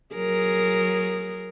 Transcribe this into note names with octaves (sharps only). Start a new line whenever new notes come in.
F#3 G#4 A#4